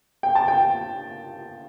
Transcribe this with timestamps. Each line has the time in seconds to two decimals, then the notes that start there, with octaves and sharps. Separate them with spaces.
0.23 G5
0.35 A5
0.48 G5